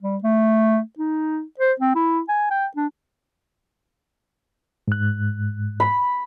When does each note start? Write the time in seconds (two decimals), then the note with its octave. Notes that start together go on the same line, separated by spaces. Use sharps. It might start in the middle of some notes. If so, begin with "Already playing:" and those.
0.03 G3
0.24 A3
0.99 D#4
1.60 C5
1.80 C4
1.96 E4
2.29 G#5
2.51 G5
2.77 D4
4.88 G#2 F#6
5.80 B5